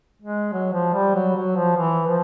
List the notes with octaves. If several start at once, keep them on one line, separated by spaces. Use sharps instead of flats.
G#3
F#3
F3
G3
F#3
F#3
F3
E3
F3